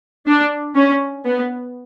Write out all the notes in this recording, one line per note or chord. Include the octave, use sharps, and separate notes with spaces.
D4
C#4
B3